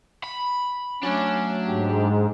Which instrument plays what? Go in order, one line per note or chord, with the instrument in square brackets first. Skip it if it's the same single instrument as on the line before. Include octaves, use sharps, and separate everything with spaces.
[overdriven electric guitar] B5
[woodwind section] F#3 A3 [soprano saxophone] C#4 [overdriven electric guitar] D4
[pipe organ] G#2 [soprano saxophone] G4